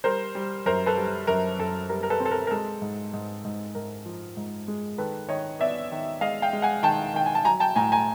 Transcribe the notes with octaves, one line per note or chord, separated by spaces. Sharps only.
G3 A#4 C5
G3
F#2 A#4 C5
A4 B4
G3
F#2 A#4
F#2 A4
G3 A#4
A#4
A4 B4
C4
A4
A#4
A#4
G#3 A4
G#2
G#2
G#2
G#2 A#4
F3
G#2
G#3
D#3 A4 B4
D#3 C#5 D#5
B3 D5 E5
D#3
G#3 D#5 F5
F5 G5
G#3
F#5 G#5
D#3 G5 A5
D#3 G5
G#5
A5
F#3 G#5 A#5
G5 A5
A2 G#5 A#5
G#5 A#5